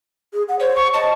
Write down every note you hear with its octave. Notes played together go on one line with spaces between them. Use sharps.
G#4
F#5
C5 C#5
C#6
D#5 A5